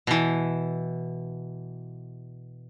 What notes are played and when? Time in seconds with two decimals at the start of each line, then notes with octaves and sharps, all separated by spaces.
0.07 B2 E3